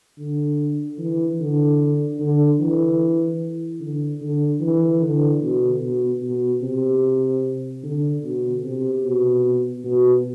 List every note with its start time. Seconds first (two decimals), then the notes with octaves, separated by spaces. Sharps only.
0.19 D3
0.99 E3
1.40 D3
2.20 D3
2.60 E3
3.80 D3
4.22 D3
4.61 E3
5.02 D3
5.42 B2
5.82 B2
6.23 B2
6.62 C3
7.83 D3
8.24 B2
8.63 C3
9.04 B2
9.84 B2